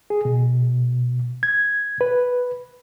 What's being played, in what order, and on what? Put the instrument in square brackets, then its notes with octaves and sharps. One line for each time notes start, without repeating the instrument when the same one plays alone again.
[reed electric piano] G#4
B2
G#6
B4